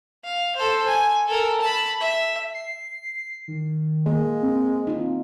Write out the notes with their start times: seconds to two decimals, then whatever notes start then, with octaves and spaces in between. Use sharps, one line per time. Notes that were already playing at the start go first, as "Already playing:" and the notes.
0.24 F5
0.56 A4 C5
0.87 G#5
1.28 A4 A#4
1.61 A5 B5
2.00 E5
2.54 C7
3.48 D#3
4.06 G#3 A#3
4.42 C4
4.87 D#4 F4